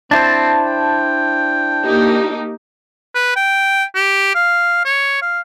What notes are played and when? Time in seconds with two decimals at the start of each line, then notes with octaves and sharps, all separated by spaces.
0.11 C4 D4 E4 C5 A5
0.65 G5
1.83 A#3 D#4 G4
3.15 B4
3.36 G5
3.95 G4
4.35 F5
4.85 C#5
5.22 F5